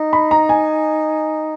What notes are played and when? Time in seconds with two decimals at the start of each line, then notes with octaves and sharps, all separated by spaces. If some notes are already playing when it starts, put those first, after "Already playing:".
Already playing: D#4
0.13 B5
0.31 A#5
0.49 G#5